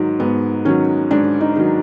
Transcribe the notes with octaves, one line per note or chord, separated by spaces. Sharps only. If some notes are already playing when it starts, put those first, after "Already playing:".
Already playing: G#2 D#3 F#3
G#2 B3
D#3 F#3 C#4
G#2 D4
D#4
D#3 F#3